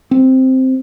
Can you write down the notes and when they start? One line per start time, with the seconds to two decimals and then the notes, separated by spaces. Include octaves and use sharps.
0.11 C4